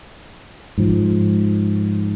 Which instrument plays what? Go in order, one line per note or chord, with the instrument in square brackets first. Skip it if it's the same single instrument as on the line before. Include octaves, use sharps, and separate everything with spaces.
[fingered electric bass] G#2 F3